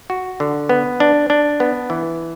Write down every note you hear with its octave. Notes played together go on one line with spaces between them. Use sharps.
F#4
D3
B3
D4
D4
B3
E3